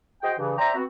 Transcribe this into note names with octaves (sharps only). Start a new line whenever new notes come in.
F#4 G#4 C5 D#5 G5
G2 C#3 E3
C5 D5 E5 G5 A#5
B3 C4 F#4